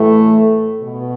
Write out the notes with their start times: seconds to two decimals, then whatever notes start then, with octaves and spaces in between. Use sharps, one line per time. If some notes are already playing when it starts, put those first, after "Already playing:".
Already playing: A2 E3 A3
0.81 B2